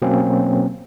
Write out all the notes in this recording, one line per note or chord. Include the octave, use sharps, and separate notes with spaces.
B2 F#3 A#3 C4 C#4